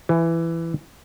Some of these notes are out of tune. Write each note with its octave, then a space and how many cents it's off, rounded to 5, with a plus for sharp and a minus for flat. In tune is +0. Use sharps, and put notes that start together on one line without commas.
E3 +15